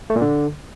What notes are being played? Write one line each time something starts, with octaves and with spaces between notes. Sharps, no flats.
A3
A#2
D3